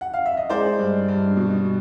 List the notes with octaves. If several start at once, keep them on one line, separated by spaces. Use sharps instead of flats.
F#5
F5
E5
D#5
G#3 C5 D5
G2
G2
B2